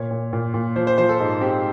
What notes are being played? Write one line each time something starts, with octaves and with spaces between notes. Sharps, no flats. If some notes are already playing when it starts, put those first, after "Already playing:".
Already playing: A#2 C#5
A#2
A#2
A#2
F3 C5
C5
F3 C5
A4
G#2 A4
C4 G4